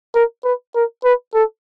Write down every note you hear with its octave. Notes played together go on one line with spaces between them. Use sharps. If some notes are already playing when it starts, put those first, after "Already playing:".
A#4
B4
A#4
B4
A4